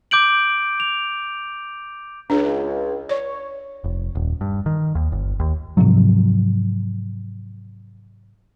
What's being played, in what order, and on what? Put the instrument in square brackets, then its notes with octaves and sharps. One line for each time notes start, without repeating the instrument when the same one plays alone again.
[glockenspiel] D6 G6 D7 F#7
F7
[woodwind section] C#2 [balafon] D4 G#4
[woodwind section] C#5 [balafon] D5
[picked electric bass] F1
D#1
G2
D#3
D#2
G1
D#2
G#2 C3 F3 F#3